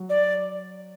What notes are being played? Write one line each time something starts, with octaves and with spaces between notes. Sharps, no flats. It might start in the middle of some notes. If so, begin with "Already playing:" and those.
Already playing: F#3
D5